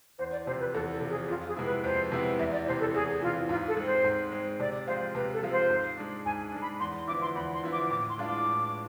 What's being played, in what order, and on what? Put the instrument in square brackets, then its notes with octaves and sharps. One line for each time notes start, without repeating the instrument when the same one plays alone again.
[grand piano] E2 [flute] C5
[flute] D5
[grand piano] C3 F3 [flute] C5
[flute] B4
[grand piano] E2 [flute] A4
[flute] A4
[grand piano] C3 F3
[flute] G#4
[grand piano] F2 [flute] F4
[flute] G#4
[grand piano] C3 G#3 B3 E4
[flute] B4
[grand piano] F2 [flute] C5
[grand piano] C3 G#3 B3 E4
[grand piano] E2 [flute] E5
[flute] D5
[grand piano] E3 [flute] C5
[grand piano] C3
[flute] A4
[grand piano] E2 [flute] G#4
[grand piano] E3 [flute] F4
[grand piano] C3
[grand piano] G#2 [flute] F4
[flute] A4
[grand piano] G#3 C4
[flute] C5
[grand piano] G#2
G#3 C4
[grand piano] C3 [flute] D5
[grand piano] F3 G#3 C4 F4 [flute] C5
[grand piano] C3 [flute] B4
[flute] A4
[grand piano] F3 G#3 C4 F4
[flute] C5
[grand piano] G#2
G#3 D4
[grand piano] G#2 [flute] G#5
[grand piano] G#3 D4
[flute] B5
[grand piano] E2 [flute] C6
[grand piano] D3 F3 B3 E4 [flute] D6
[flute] C6
[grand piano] E2 [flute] B5
[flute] C6
[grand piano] D3 F3 B3 E4
[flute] D6
[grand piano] A2 [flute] D6
[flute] C6
[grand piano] E3 G#3 D4 F4
[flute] D6
[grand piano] A2